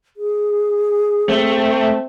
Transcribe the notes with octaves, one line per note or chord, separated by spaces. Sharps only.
G#4
A3 C4